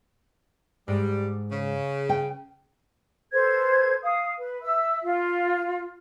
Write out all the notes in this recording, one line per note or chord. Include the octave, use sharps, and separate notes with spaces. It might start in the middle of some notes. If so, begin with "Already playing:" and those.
G#2 G3
C#3
G5
A4 B4 C5 G#6
F5 D#6
B4
E5 E6
F4